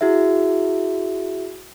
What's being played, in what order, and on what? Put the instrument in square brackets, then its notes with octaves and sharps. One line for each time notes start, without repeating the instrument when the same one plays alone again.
[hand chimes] E4 F#4 G#4 E5